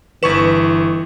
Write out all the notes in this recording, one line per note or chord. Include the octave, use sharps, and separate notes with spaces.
G1 E3 B4 C#6 E7